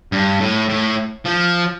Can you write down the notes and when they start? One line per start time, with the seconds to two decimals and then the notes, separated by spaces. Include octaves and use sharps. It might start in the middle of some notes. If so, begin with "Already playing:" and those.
0.12 G2
0.41 A2
0.69 A2
1.25 F3